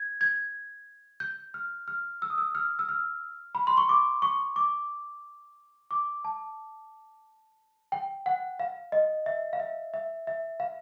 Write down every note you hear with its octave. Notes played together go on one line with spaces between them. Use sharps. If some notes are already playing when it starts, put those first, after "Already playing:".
Already playing: G#6
G#6
G6
F6
F6
E6
D#6
E6
F6
E6
F6
B5
C6
C#6
D6
C#6
D6
D6
A5
G5
F#5
F5
D#5
E5
F5
E5
E5
E5
F5